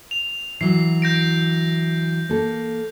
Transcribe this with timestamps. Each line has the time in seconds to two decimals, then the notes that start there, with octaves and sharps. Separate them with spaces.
0.11 F7
0.61 E3 F#3 C7
1.02 G6 A#6 D7
2.29 A#3 A4